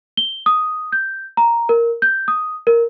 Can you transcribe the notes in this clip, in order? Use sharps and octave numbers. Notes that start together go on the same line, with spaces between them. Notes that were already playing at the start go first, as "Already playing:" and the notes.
G7
D#6
G6
A#5
A#4
G6
D#6
A#4